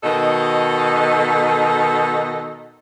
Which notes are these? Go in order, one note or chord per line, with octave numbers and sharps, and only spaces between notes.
B2 D#3 A4 D#5